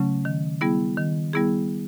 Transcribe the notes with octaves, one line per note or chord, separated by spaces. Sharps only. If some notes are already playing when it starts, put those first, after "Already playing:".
Already playing: C#3 F#3 A3 C#4
D#3
G3 B3 E4 G#4
D#3
G3 B3 E4 G#4